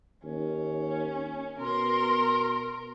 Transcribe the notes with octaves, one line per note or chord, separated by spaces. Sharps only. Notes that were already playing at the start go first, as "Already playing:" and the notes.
D#2 C#4
B2 A#4 C6